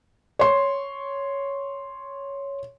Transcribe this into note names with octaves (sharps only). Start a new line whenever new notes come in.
C#5 C6